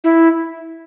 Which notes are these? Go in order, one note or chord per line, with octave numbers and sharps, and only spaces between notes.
E4